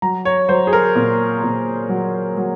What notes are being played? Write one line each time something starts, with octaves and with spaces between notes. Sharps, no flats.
F#3 A#5
C#5
F#3 C5
G#4
A#4
A#2
A#2
F#3
F#3